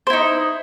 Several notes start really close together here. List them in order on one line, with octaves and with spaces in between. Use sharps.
C5 E4 D#4